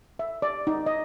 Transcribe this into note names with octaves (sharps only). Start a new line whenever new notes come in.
E5
D5
D#4
D#5